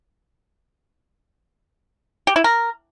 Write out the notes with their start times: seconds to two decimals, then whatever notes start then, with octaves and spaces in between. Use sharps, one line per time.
2.27 G4
2.36 E4
2.44 A#4